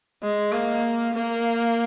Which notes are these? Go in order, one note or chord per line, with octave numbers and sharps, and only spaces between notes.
G#3
A#3
A#3